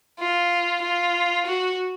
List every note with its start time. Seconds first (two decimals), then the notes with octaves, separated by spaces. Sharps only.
0.20 F4
0.82 F4
1.46 F#4